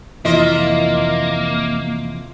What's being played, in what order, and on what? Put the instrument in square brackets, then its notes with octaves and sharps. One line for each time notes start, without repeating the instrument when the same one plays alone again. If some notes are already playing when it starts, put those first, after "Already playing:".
[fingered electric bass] F1 F2 E3 [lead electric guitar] A#3 [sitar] F4 D#5 E5